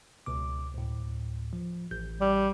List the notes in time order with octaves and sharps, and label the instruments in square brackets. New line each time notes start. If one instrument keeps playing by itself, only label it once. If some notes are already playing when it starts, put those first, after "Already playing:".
[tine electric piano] C#2 B2 D6
D2 A2
F3
A1 G6
[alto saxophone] G3